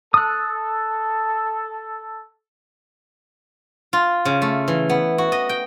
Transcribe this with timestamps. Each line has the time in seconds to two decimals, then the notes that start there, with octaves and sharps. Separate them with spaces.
0.14 A4 D#6 F#6
3.93 F4
4.25 C#3
4.42 A3
4.68 E3
4.90 B3
5.18 F#4
5.32 D#5
5.49 G5